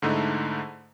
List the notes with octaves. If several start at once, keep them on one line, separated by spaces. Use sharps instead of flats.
G#2 D3 A3 D#4 E4